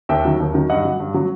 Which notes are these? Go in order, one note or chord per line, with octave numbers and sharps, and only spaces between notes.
D#2 E5 G5
D#3 F#3
D#2
D#3 F#3
G2 D#5 F#5
F#3
G2
F#3